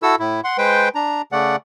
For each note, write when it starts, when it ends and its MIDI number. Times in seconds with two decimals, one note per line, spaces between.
0.03 0.16 64
0.03 0.16 66
0.03 0.16 69
0.03 0.16 88
0.19 0.41 45
0.19 0.41 64
0.44 0.57 78
0.44 0.57 84
0.58 0.89 56
0.58 0.89 71
0.58 0.89 72
0.58 0.89 79
0.95 1.22 62
0.95 1.22 82
1.32 1.56 49
1.32 1.56 57
1.32 1.56 74
1.32 1.56 78